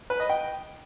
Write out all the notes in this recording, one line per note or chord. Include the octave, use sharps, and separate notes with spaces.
B4
D#5
G5